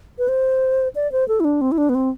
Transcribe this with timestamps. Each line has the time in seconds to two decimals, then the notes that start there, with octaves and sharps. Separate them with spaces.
0.18 B4
0.28 C5
0.95 D5
1.12 C5
1.28 A4
1.40 E4
1.45 D4
1.61 C4
1.72 E4
1.78 D4
1.89 B3
1.95 C4